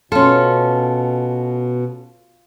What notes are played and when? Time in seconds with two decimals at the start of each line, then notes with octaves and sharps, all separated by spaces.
0.12 B2 C#4 F4 A4